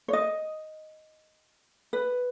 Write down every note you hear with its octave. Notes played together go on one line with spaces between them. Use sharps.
C#5
D#5
B4